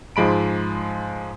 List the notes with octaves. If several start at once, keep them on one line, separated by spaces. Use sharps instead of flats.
G#2 F3 G#3 B5 D7